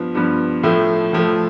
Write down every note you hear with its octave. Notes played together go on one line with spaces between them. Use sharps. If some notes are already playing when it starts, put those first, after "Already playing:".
Already playing: G2 F3 B3
G2 F3 B3
A2 F3 A3
A2 F3 A3